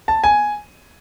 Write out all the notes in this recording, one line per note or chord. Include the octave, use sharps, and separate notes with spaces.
A5
G#5